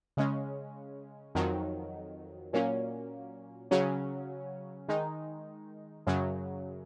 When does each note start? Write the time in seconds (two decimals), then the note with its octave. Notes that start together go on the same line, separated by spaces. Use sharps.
0.17 C#3 G#3 C#4
1.35 F2 D#3 F#3
2.53 A#2 F#3 A#3 C#4
3.71 C#3 F#3 C#4
4.88 D#3 G#3 D#4
6.07 F#2 C#3 F#3